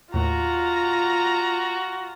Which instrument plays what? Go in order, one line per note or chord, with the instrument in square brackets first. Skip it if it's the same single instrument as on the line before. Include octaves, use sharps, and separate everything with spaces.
[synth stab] D#2 A2 [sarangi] F4 [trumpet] F#4 [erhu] A#5